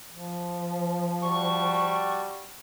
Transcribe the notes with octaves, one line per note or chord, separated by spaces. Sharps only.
F3
G3 F#4 A5 C#6